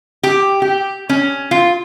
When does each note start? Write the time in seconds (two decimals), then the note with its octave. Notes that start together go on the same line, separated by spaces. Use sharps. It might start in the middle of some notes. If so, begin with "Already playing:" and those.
0.23 G4
0.62 G4
1.09 C#4
1.51 F4